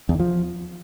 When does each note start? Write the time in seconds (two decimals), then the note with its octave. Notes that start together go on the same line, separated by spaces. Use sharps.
0.09 E2
0.14 D#3
0.20 F3